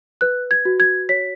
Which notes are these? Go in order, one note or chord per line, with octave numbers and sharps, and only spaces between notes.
B4 F#6
G#6
F#4
G#6
C#5 B6